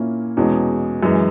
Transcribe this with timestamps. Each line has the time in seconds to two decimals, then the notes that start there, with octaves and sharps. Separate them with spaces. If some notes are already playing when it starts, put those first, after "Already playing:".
Already playing: A#2 A#3 C#4 E4
0.37 E2 B2 G#3 C#4
1.03 F#2 E3 G#3